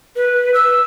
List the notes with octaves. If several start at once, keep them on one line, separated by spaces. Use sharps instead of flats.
B4
E6